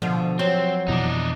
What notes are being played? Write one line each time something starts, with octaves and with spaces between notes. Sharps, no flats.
B2 D3 F3
F#3 C4
F2 B2 E3 D4 D#4